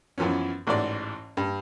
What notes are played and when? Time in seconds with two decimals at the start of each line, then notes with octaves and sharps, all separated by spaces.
0.18 F#2 E3 F3 B3 C#4
0.67 A1 G#2 E3 F#4 D5
1.37 G2